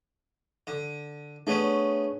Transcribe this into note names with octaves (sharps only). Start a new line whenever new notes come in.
D3
A3 B3 C#4 D4 G#4 C#5